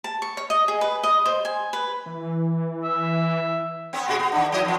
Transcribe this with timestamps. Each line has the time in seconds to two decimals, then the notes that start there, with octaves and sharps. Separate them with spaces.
0.04 A5
0.22 C#6
0.37 C#5
0.50 D#5
0.68 G#4
0.81 B4
1.03 D#5
1.26 C5
1.45 G#5
1.73 B4
2.06 E3
2.84 E5
3.93 B3 C4
4.08 B2 F#4 G#4
4.19 B3
4.32 D#3 D4
4.52 F3 D#5
4.65 F2 F3